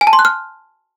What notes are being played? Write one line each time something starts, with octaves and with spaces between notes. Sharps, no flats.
G#5
A5
C6
F#6
F6